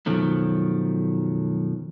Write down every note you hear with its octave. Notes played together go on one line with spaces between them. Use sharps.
F#2 B2 D#3 F3 F#3 A3